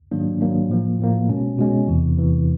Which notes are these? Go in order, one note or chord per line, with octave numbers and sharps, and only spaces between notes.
G#2 D#3 F#3 A#3 D4
G#2 D#3 F#3 A#3 D4
A2 F3 A#3
A2 F3 A#3
B2 G#3 C#4
B2 G#3 C#4
E2 C3 E3
E2 C3 E3